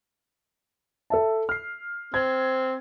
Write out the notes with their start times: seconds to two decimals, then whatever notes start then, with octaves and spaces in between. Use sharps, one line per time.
1.10 A4 E5 A5
1.49 F6 C7
2.14 C4 G#6